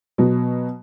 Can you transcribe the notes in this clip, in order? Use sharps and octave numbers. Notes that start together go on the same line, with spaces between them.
B2 F#3